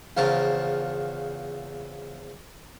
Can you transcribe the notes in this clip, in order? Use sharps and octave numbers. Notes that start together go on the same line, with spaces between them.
E2 C#3 F3 A#4 A5